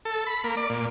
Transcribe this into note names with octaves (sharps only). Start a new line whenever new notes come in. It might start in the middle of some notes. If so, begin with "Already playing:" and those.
A4
B5
A#3
D5
A#2